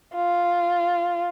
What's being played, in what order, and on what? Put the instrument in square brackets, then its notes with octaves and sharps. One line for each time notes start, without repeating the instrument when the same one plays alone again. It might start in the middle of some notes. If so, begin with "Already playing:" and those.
[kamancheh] F4